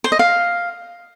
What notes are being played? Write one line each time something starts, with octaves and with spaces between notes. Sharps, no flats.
C5
D#5
F5